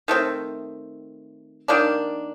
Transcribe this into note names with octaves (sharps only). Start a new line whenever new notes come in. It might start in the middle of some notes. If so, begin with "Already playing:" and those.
D#3 A3 C4
D#3 A#3 D4